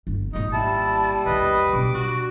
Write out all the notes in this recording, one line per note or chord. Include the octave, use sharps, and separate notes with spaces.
G1
G#1 A#2 D#4
G3 E4 A5
A#1 E2 B4 D#5
B2 D4 D6
F#4